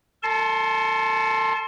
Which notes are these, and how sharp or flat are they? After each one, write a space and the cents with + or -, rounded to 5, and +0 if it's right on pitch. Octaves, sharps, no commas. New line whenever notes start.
A4 +30 A5 -25 C6 +20